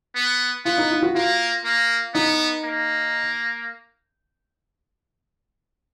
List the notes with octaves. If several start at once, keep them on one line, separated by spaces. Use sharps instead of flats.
B3
B3 F4
D#4
F4
F#4
A#3 F4
A#3
B3 D#4
A#3